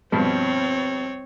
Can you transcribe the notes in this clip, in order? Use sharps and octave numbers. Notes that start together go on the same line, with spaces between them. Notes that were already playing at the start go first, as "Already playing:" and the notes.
G2 B2 F3 C4 C#5